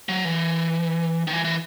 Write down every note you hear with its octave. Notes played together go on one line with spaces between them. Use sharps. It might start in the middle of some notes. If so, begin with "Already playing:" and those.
F#3
E3
D#3
E3
E3